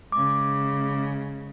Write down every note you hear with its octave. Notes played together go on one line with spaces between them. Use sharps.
C#3 G#3 D6